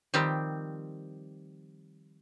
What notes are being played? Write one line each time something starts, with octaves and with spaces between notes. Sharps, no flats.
D#3 F3 G3 C4 G4